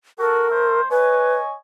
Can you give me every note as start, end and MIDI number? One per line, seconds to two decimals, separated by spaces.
0.19 0.45 66
0.19 0.45 69
0.19 0.81 70
0.50 0.85 57
0.50 0.85 72
0.90 1.34 71
0.90 1.54 73
0.90 1.54 75
0.90 1.54 80